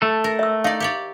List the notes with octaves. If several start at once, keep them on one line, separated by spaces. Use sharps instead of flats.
A3 A4
A#4
E5 E6
D#4 D5 F5
G4 C#5 D5